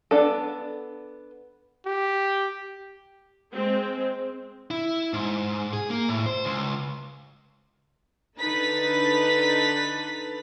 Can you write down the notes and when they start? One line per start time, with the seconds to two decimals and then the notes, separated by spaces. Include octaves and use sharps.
0.11 B3 D4 A4
1.86 G4
3.54 G#3 C4
4.71 E4
5.13 G#2
5.73 G#4
5.90 A#3
6.09 A2
6.26 C5
6.45 C#2
8.39 D3 D#4 A4 B4 A6 B6